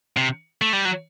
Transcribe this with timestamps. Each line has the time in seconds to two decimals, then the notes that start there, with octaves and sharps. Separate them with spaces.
0.17 C3
0.62 A3
0.73 G3
0.85 F#3